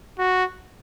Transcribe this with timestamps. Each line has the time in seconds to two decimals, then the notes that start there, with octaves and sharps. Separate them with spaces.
0.19 F#4